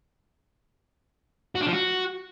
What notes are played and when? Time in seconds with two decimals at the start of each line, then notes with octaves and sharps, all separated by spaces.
1.55 F#4
1.61 D4
1.67 F3
1.72 F#4